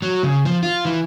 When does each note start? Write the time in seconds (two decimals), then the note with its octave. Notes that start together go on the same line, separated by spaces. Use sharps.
0.02 F#3
0.23 C#3
0.45 F3
0.63 F4
0.85 E3